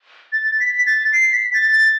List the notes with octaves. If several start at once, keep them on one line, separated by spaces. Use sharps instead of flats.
A6
B6
A6
C7
B6
A6
A6